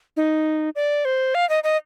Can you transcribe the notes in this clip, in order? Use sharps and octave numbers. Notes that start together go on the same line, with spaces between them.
D#4
D5
C5
F5
D#5
D#5